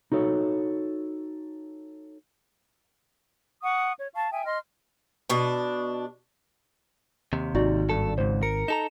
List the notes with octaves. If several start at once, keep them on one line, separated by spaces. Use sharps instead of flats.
D#4 F#4 A4 C#5
F#5 C#6 D#6
C#5
F5 A5 C#6
E5 G5 G#5 D#6
D#5 C6 F6
B2 D4
D#2 C3
G#1 D#4 F#4 D5
G2 A4
C#2 G#2 C5
A#4 C#7
D#4 A4 A#5 E7